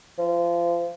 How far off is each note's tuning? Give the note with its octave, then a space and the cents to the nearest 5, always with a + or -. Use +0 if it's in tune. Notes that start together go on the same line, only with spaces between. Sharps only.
F3 -25